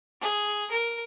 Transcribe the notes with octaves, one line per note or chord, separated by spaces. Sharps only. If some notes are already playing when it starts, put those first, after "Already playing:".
G#4
A#4